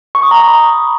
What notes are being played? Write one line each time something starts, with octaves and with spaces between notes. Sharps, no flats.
C#6
D#6
A#5
D#6
B5